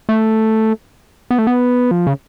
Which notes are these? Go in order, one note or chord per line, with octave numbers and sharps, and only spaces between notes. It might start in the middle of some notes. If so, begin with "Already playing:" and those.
A3
B3
A3
B3
F3
C#3